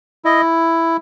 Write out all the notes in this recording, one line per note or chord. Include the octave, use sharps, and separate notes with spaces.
E4 D#5